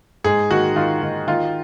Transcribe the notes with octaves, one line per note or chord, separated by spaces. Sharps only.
G#2 G#4
D#3 F#4
D#3 F4
D#3
D#3 F4